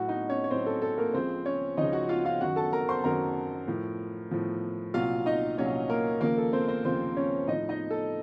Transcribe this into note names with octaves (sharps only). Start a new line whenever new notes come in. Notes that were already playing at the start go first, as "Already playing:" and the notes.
Already playing: A2 F#3 F#4 F#5
D#4 D#5
C#4 C#5
C#5
A2 F#3 C4 C5
A4
A4
A#3 A#4
C#2 C#3 F3 C4 C5
C#4 C#5
C#2 C#3 F3 D#4 D#5
F#4 F#5
F4 F5
F4 F5
F#2 D#3 F#3 F#4 F#5
A4 A5
A#4 A#5
C5 C6
F#2 D#3 F#3 A#4 A#5
A2 F3
A2 F3
C2 A#2 F#3 F4 F5
D#4 D#5
C2 A#2 F#3 C#4 C#5
A#3 A#4
D#2 C#3 F3 A#3 A#4
A4
C4 C5
C4 C5
D#2 C#3 F3 C4 C5
C#4 C#5
A2 F3 D#4 D#5
D#4 D#5
A4